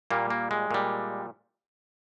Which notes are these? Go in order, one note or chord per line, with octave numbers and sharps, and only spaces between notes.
A#2 G3 A#3
A#3
G#3
A#2 G3